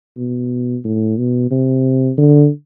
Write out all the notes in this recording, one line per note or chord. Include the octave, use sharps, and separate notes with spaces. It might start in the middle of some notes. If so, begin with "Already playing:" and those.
B2
A2
B2
C3
D3